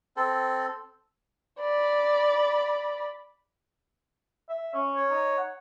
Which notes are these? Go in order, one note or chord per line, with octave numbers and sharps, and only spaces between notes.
C4 A4
D5 B5
E5
C#4
C#5
D#4
F#5